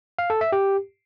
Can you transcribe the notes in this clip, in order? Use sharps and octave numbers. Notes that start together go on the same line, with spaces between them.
F5
A4
E5
G4